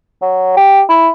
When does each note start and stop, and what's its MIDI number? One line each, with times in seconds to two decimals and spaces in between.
0.22 0.52 54
0.57 0.82 67
0.89 1.10 64